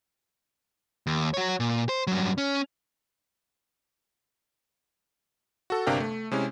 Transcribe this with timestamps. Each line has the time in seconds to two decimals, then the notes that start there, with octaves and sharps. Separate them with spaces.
1.07 D#2
1.34 F#4 C#5
1.60 A#2
1.89 C5
2.07 G2 F#3
2.38 C#4
5.70 F#4 A4
5.86 G1 C3 D4 A#4 F5 G5
6.00 A3
6.31 C3 G#3 C#4 E4